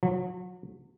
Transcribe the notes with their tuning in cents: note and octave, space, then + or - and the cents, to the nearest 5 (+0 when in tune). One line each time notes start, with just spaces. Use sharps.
F#3 -35